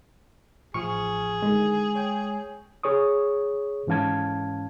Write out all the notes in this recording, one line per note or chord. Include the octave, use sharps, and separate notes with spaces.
A1 F3 G#4 C#6 F6
D3 D#3 G#3
C#5 G5
G#4 C#5 C#6 D#6
G#2 E3 C#4 F5 A5 G#6